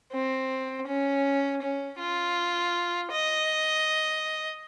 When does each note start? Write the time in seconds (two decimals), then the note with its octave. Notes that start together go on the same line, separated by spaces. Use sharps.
0.12 C4
0.87 C#4
1.62 C#4
1.99 F4
3.11 D#5